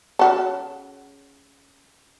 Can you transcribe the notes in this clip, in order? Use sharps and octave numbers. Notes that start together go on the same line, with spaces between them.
C#3 F#4 A4